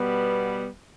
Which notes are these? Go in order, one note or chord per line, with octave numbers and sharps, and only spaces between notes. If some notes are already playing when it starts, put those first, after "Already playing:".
Already playing: B2 G3 B3